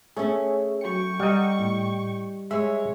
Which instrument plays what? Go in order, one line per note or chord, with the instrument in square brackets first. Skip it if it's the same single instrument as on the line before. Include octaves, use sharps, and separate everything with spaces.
[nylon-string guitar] A3 C#4 [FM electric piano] G#4 C#5 E5
[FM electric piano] F#3 C#7 [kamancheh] G5 C#6
[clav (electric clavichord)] G3 D#5 [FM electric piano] F#5 A#5
[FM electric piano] A2
[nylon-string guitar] G#3 [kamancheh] C#5 [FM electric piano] E5